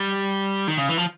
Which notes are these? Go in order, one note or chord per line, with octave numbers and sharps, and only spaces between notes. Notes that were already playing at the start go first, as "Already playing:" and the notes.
Already playing: G3
D#3
C#3
E3
F3